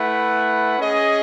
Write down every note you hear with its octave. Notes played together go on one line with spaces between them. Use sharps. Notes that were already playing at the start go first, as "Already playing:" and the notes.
Already playing: A3 E4 B4 F#5
C#4 G#4 D#5